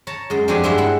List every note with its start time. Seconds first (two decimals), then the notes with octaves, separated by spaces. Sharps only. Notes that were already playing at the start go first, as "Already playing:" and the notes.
0.07 C#5 A5 A#5
0.30 F#2 G#3
0.48 F2 D4 F#4 G4 C5 G#5
0.64 G2 G#3 C4 F#4 E5
0.78 E4 F#5